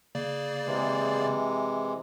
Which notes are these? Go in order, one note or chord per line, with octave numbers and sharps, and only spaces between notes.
C#3 A#3 D5
C3 E3 G#3